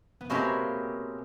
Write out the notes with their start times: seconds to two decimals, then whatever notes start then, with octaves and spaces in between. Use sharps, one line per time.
0.21 B3
0.30 B2 G#3 A#3 C4 C#4 E4 G4